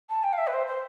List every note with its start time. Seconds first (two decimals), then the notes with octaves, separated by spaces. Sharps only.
0.09 A5
0.23 G5
0.33 F5
0.38 E5
0.47 B4
0.53 C5
0.67 C5